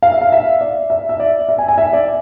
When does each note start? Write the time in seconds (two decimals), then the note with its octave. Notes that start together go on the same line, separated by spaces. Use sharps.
0.02 F5
0.12 E5
0.21 F5
0.32 E5
0.61 D5
0.90 E5
1.09 E5
1.20 D5
1.49 E5
1.58 G#5
1.68 G#5
1.78 E5
1.93 D5